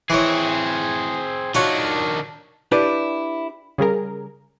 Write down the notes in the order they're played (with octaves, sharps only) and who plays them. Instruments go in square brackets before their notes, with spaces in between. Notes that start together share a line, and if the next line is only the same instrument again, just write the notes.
[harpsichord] E3 C#5 [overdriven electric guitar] C4 G#4
[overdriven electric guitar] D#3 D4 [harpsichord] F4 F#4 C#5
[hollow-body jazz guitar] D4 E4 G4 B4 D5
[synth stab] C#3 G3 G#4 A#4